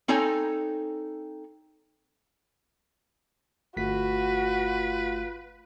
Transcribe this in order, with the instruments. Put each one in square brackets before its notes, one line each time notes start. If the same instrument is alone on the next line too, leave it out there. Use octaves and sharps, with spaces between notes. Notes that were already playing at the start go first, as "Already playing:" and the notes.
[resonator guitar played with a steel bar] C4 D#4 A4 C#5 G#5 A#5
[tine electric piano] G1 A3 B6 [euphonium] F4 [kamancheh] F#4 [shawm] B4